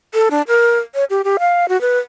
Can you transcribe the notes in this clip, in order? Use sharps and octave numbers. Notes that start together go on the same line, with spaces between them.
A4
D4
A#4
C#5
G4
G4
F5
F#4
B4